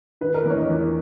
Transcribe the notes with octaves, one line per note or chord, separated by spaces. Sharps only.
D#3 B4
A#4
B4
E2 C#5
D#5
E2